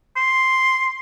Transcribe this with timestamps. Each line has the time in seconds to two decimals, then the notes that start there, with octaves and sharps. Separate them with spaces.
0.17 C6